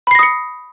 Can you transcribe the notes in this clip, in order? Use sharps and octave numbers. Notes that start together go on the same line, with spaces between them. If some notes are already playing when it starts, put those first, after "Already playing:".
B5 D#6 A#6 C7 C#7